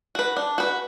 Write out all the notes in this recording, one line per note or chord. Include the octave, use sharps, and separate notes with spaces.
F#4 B4
D4
F#4 B4